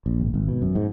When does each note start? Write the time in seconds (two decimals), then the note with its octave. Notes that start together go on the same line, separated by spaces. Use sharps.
0.06 A#1
0.21 G#1
0.34 G#1
0.48 B2
0.62 F#2
0.75 G#2